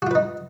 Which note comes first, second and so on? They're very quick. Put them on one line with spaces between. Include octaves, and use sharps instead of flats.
F#4 F4 B4 D#4